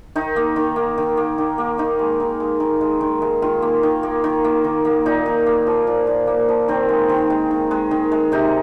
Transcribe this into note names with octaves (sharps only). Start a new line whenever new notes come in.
D#3 D#4
A#3
D#3
A#3
D#3
A#3
D#3
A#3
D#3 D#4
G#3
D#3
G#3
D#3
G#3
D#3
G#3
D#3 F4
A#3
D#3
A#3
D#3
A#3
D#3
A#3
A#2 D#4
A#2
A#3
F3
A#2
A#2
A#3
F3
D#3 C4
G#3
D#3
G#3
D#3
G#3
D#3
G#3
C3 D#4